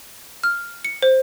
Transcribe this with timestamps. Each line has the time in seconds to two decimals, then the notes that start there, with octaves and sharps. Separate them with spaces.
0.44 F6
0.85 C#7
1.02 C5